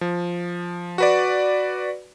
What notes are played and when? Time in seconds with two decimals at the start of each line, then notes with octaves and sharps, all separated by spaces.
0.01 F3
0.98 F#4 B4 D5